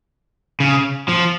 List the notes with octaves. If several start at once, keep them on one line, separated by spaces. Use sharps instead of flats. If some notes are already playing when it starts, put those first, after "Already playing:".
C#3
F3